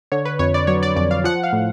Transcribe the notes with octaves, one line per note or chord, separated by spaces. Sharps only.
D3 C#5
B4
F2 C#5
D5
F#3 C#5
D5
F2 D5
F5
F3 F#5
F5
A2